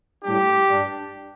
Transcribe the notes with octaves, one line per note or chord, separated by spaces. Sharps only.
A2 G3 D4 G4
G2 G3 D4